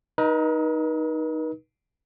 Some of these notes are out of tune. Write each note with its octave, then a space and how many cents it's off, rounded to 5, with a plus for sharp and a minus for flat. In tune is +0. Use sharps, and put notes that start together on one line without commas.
D#4 +0 B4 -45 D#6 +40